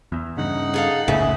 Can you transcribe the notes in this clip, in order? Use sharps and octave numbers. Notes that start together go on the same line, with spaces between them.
E2
G2 C#3 D#4 F#5
G#4 A4 F5
F#1 C#2 A2 C#3 E5